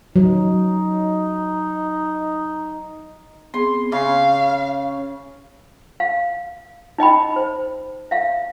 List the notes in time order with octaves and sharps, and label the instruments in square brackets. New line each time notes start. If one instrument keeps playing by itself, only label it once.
[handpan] F#3 [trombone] D#4
[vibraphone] B3 C4 G#4 [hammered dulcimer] C6
[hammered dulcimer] C#3 [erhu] F5 [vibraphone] C#6
[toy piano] F5
D#4 D#5 G5 B5
C5
E5 F5